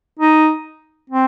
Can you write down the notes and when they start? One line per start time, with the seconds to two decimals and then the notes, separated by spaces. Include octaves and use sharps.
0.19 D#4
1.10 C4